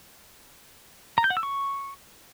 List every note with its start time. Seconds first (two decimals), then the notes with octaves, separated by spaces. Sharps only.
1.18 A#5
1.24 G6
1.30 F#5
1.37 E6
1.43 C#6